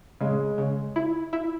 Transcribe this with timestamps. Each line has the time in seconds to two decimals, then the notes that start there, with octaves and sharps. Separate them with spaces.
0.21 C#3 G#3
0.58 C#3
0.96 E4
1.33 E4